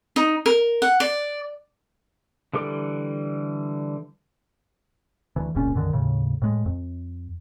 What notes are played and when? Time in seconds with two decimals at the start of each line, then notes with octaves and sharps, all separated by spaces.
0.16 D#4
0.46 A#4
0.82 F#5
1.00 D5
2.53 D3 E3 G3 A4 D6
5.36 D2 E3
5.55 F1 C#2 A#2 C#4
5.74 B1 F#2 D3 D#3
5.93 D#2 A2 C#3
6.42 A2 G#3
6.66 F2